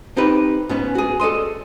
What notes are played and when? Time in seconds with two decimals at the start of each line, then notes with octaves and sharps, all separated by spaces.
0.17 C4 D#4 G4 B4
0.69 G#2 B3 C#4
0.95 F#4 G#4
1.20 A4 D5 D#5 C6